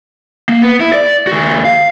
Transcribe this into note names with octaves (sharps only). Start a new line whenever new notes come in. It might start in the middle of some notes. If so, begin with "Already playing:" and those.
A#3
B3
E4
D5
D#2 F#4
F5